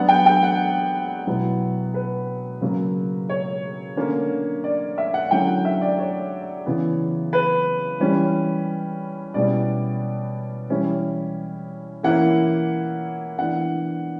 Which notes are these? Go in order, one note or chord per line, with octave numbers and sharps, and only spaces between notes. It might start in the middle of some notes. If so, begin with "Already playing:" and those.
Already playing: F#3 B3 D4 F#5
G5
G5
F#5
B2 F#3 B3 E4
B4
C#3 F#3 A#3
C#5
D3 A#3 C#4
D5
E5
F#5
D3 F#3 C#4 E4 G5
F#5
E5
D5
C#5
C#3 E3 B3
B4
E3 G3 C#4
B2 G3 C#4 E4 D5
E3 G3 C#4 E4
E3 A#3 C#4 E4 F#5
E3 B3 D4 F#5